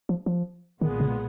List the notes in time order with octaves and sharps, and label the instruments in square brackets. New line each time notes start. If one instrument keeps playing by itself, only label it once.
[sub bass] F3
F3
[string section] B1 A#2 G#3 B3 [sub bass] D#3
[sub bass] C#3